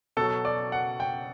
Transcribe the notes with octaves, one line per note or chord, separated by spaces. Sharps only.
B2 F#3 A4
D5
F#5
G5